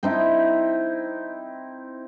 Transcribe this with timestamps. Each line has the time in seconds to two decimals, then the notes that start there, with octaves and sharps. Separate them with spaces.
0.03 C4 D#4 E4